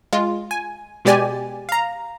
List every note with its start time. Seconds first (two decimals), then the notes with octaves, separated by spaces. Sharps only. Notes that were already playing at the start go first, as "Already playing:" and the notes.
0.13 G#3 F4
0.51 G#5
1.05 B2 G#3 G4 D5 G#5
1.69 F5 A#5